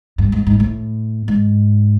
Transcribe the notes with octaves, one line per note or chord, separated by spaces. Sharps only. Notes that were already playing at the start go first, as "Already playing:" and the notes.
G2
G#2
G#2
A2
G#2